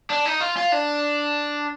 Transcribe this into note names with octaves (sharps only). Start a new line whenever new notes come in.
D4
D#4
F4
F4
D4